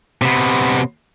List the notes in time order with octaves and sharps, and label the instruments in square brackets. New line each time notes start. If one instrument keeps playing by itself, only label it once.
[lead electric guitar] C3 B3